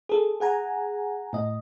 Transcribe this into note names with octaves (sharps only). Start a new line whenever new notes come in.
G#4 A4
G#4 F#5 G#5 A#5
A2 D#5